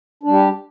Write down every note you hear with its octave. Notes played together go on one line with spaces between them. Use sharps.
G3 D4 G4